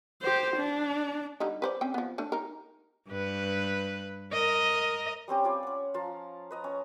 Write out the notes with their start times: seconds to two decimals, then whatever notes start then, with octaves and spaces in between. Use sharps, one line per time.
0.22 G4 C5
0.57 D4
1.40 D3 G3 D#4
1.62 B4 C5 D5
1.81 C4 C#4 G5
1.94 F3 B3
2.18 A3 D4
2.32 D#4 A#4
3.09 G2 B4
4.32 A#4 D#5
5.28 G3 C4 C#4 G4
5.44 F4 D5 G#5 B5
5.63 C#4 F#5
5.94 F3 F4 A5 A#5
6.51 B4 D#5 A#5
6.64 C#4